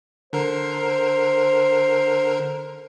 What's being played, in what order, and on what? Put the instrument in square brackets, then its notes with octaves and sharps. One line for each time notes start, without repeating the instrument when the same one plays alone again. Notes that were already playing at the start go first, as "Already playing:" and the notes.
[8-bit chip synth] D3 A#4 [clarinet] C5